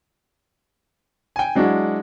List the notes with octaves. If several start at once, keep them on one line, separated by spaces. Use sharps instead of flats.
G5 G#5
F#3 G#3 D4 E4 F#4